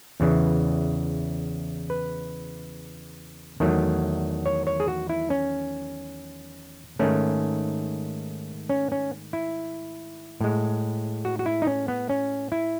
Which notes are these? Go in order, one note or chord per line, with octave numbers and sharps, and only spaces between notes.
E2 C#3 E3
B4
E2 D#3 F#3 A3
C#5
C#5
G#4
F#4
E4
C#4
G#2 D#3 A3 C#4
C#4
C#4
E4
A2 G#3
F#4
F#4
E4
D#4
C#4
B3
C#4
E4